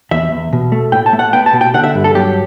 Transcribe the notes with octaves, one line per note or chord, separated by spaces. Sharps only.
E2 E5
E2
B2
A3
A2 G5
A5
A3
F#5
B3 G5
A5
B2
G5
D3 F#5
E5
G2
A4
F#3 G4